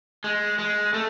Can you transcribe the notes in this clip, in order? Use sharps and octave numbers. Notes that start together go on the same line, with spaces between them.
G#3
G#3
A3